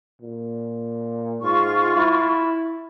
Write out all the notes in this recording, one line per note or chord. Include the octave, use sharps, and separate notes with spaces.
A#2
G#2 F4 C#6
E4